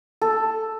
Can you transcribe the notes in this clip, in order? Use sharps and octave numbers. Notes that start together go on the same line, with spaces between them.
A4